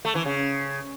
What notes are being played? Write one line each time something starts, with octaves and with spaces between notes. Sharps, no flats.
A3
E3
C#3